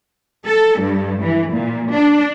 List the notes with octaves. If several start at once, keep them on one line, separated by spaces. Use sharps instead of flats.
A4
G2
E3
A#2
D4